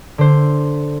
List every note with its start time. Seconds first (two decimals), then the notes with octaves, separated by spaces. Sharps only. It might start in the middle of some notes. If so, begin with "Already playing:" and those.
0.18 D3 C5